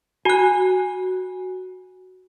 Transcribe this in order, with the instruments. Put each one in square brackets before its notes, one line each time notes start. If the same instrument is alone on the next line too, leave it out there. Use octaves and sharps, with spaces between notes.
[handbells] F#4 F#6 [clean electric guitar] G#5